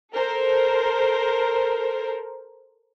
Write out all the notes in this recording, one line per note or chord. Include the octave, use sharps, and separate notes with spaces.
A4 A#4 C5